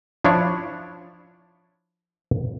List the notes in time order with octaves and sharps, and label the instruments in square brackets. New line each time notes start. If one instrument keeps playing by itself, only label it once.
[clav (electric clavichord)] F3 D4 E4 C#5